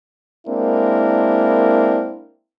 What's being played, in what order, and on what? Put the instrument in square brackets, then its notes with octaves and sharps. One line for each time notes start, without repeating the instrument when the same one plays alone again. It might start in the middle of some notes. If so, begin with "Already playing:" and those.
[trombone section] G#3 A#3 C4 D4 E4 A#4